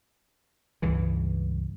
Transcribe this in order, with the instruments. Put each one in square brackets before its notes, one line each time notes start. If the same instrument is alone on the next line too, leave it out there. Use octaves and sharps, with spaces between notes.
[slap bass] C#2 G2 E3